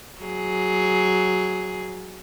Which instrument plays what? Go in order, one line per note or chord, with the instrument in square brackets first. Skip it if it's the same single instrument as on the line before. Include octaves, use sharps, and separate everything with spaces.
[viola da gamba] F#3 G#4